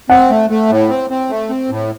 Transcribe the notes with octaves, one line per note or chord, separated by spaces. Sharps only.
C4 F#5
A3
A3
A2
C4
C4
A3
C4
A2